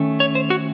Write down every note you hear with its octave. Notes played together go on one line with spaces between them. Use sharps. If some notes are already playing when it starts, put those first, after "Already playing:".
Already playing: D#3 A3 C#4
C#5
C5
F#4